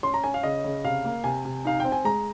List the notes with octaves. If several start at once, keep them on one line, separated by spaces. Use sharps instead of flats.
C#4 C6
A#5
C#4 G#5
F5
C#3 D#5
C#3
C3 F5
A#3
C3 G#5
C3
D#4 F5
C4 G5
G#5
G#3 A#5